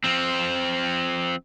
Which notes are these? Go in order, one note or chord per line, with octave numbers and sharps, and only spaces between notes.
F3 C4